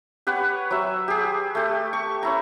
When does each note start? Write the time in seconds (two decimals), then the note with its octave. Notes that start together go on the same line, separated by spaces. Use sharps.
0.27 G4 B4 C#5 F#5
0.71 F#3 E5
1.08 G4 G#4
1.55 A3 G4
1.93 C#6
2.23 C#4 E4 A#5